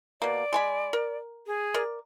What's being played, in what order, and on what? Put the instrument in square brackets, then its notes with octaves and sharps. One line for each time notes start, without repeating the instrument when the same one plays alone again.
[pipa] B2 A#3 [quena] D5
[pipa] G#3 G#5 B5
A#4
[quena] G#4
[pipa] A#4 D5